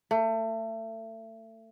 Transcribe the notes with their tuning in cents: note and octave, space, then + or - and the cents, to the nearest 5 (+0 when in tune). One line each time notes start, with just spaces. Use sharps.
A3 +30